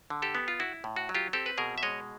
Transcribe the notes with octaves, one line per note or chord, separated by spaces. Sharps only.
D3
G4 A4
B3
F4
E4 F#4
A2
F#4
F#3
F4 G4
C4 G4 A4
B4
B2 G#4 A#4
E5
G#3 C#5 D#5